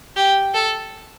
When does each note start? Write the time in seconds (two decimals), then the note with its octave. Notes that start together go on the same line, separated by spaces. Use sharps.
0.16 G4
0.54 A4